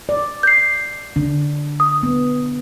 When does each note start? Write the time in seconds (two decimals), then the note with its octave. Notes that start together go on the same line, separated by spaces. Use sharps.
0.09 D5
0.43 G6 C7
1.16 D3 D4
1.80 D#6
2.03 B3